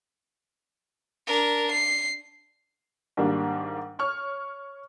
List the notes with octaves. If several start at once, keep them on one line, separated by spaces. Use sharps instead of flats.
D4 A#4
C7
G#2 D#3 G3 A#3 D4
C#5 C#6 F6